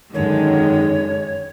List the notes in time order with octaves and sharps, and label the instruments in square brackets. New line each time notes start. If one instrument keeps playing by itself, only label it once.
[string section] F#2 D3 G#3 [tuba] D#3 [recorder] C#5